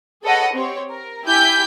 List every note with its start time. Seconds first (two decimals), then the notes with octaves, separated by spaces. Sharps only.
0.23 G#4 A4 B4 C#5 D#5 F#5
0.53 C4 G4 C#5
0.90 A#4
1.25 E4 G4 G#5 G6 B6